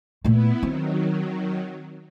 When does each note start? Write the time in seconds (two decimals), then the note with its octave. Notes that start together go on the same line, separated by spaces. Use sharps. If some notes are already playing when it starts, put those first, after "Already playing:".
0.24 A#2 A3 B3 E4
0.63 D#3 F#3 C4